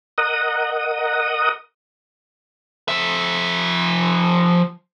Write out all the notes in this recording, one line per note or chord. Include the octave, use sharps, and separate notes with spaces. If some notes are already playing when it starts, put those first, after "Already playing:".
A#4 D#5 F#5 D#6
F3 E5